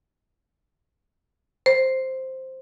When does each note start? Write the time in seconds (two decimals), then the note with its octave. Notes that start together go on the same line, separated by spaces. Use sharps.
1.66 C5